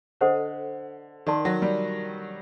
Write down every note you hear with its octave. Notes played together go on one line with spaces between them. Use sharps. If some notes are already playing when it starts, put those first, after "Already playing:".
D3 A4 C5 D#5 F#5
D#3 A#4 D5 A5 C6
F#3
G3